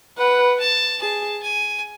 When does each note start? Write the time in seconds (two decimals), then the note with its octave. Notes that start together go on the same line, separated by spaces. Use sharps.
0.17 B4 F#5
0.60 A5
1.01 G#4 A5
1.42 G#5